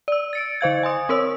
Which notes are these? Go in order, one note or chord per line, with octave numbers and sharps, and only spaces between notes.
D5 E6
A6 C#7 D7
D3 C5 F5 G#6
G#5 C6 D#6
C4 A#4 C#5 E6